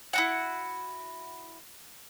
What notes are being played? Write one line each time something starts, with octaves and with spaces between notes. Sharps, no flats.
E4 F#4 F#5